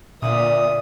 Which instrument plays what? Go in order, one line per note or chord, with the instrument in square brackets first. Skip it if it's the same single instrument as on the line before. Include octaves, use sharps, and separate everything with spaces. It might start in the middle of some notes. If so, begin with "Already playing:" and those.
[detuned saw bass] A#2 [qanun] D3 D5 F5 [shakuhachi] E5 [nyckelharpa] D#6